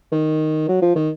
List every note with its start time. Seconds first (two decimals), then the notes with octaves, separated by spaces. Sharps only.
0.12 D#3
0.69 F#3
0.82 F3
0.96 D#3